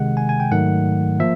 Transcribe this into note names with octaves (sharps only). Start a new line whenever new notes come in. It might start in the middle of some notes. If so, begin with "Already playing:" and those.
Already playing: C3 D#3 G#3 F#5
G#5
G#5
G5
G#2 D#3 F#3 A3 F#5
F3 A#3 E5